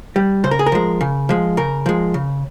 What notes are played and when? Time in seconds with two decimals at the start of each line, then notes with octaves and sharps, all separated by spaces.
0.16 G3
0.44 C#3 C5
0.51 A#4
0.59 G#4
0.66 A#4
0.72 F3 G#3
1.01 C#3
1.29 F3 G#3
1.57 C#3 A#4
1.86 F3 G#3
2.14 C#3